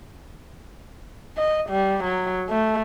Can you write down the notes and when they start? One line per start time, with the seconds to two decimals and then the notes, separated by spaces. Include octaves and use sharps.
1.38 D#5
1.69 G3
2.04 F#3
2.50 A3